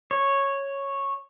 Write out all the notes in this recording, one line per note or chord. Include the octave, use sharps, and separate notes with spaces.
C#5